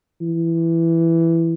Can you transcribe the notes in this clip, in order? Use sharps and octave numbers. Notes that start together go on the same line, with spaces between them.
E3